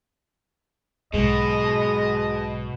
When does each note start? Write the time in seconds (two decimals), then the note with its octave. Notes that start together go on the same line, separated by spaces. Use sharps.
1.14 B1 G#2 B2 G#3 D#5